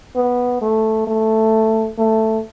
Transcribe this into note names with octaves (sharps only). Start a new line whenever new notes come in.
B3
A3
A3
A3